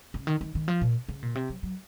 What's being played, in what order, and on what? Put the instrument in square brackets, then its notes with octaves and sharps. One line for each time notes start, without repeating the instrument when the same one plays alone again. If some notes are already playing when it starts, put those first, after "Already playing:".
[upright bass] C#3
D#3
D#3
D#3
F3
A#2
C#3
A#2
C3
F#3
F#3